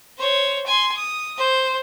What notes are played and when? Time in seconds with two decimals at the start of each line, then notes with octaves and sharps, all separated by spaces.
0.18 C5 C#5
0.66 G#5 C6
0.97 D#6
1.38 C5